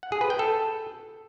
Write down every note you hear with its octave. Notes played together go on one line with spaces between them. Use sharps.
F#5
G#4
B4
G5
A4